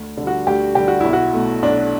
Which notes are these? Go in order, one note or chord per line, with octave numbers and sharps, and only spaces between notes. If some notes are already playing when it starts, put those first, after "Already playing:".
Already playing: D2
D3 G3
F#4
D2 G4
D3 G3 G4
F#4
B1 E4
F#4
B2 A3
B1 D4